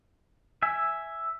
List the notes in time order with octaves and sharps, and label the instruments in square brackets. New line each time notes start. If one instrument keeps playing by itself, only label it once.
[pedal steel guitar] E5 G#5